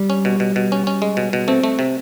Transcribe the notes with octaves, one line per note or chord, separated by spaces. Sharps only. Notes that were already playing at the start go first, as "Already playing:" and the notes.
Already playing: G3
C#4
B2
B2
B2
C#4
C#4
G#3
B2
B2
A3 C4
A3
C3